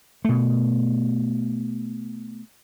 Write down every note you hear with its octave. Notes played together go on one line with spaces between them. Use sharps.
B2 A3